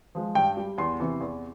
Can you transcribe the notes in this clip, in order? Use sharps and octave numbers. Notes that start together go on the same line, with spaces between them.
F3 G#3
G2 G5
G3
E2 C6
C3 E3
E2